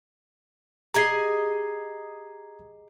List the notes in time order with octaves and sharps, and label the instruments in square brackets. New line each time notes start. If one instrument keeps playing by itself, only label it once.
[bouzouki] G4 G#4 D#5 [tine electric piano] A#5 G#6 C7